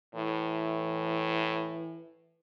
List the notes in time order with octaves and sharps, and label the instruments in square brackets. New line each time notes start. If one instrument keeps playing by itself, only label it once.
[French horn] A2 [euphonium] E3